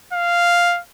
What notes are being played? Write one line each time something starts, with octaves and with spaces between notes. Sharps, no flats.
F5